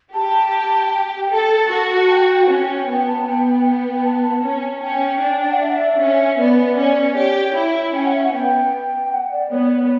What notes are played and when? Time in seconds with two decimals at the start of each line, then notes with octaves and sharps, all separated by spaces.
0.14 G4 A5
0.92 G5
1.31 A4 A5
1.71 F#4
2.10 G5
2.48 C#4
2.88 B3 G5
3.07 A5
3.27 B3 G5
3.46 G5
3.66 G5
4.04 A5
4.43 C#4
4.82 C#4 G5
5.21 D4
5.41 G5
5.51 F#5
5.61 E5
6.00 C#4
6.39 B3 D5
6.78 C#4
7.17 G4 C#5
7.56 E4
7.95 C#4 G5
8.05 F#5
8.14 E5
8.24 F#5
8.33 B3 G5
9.12 F#5
9.32 D5
9.50 B3 C#5